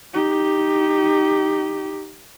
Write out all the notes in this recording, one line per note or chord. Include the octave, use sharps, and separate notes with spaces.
D#4 G4